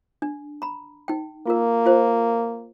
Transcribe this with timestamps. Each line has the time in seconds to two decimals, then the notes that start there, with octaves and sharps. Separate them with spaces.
0.22 D4
0.62 A#5 B5
1.08 D#4 G5
1.47 A#3 F4 A#4
1.85 F4 C5